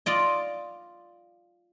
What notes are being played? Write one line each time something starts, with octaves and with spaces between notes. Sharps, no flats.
F4 D5 D#5